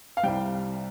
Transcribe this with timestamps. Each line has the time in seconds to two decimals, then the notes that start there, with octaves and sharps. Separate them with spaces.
0.17 F5
0.23 C2 C3 G3 G5